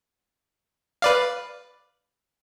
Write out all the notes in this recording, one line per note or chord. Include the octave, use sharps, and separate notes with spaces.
B4 D5 F5